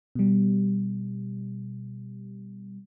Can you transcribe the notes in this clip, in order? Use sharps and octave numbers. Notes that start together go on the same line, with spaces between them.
B2 G3